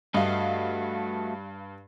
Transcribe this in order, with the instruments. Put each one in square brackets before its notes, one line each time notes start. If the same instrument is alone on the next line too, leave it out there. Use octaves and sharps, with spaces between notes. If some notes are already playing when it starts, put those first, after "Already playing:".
[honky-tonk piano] G2 F5 [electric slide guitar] A3 F#4 D#5